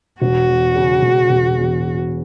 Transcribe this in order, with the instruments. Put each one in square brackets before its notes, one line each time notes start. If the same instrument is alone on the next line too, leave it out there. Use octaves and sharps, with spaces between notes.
[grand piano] E1 [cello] F#4
[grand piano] E2
C#3
E1
E1
E2